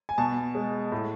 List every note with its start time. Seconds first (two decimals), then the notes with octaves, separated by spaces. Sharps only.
0.09 G#5
0.18 B2 A5
0.55 G#3
0.92 A2